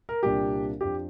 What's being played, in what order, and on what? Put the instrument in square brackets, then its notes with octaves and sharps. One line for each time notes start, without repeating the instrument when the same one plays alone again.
[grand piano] A#4
C2 A#2 A#3 D4 G4
F2 F3 D4 G4